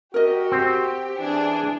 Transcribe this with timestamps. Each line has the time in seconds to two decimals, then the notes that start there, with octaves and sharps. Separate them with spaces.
0.14 F#4 G4 A#4 D#5
0.52 C4
1.20 E3 D4 G#4